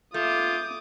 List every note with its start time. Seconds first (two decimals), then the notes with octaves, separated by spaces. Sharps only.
0.14 A3 F4 D6 D#6 G6